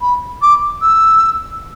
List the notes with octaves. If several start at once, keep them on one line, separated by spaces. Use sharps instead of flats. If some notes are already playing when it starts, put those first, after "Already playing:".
B5
D6
E6